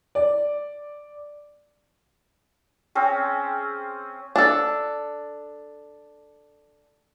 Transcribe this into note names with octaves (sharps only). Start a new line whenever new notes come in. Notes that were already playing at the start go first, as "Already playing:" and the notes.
D5
C4 C#4 G#4
D4 A4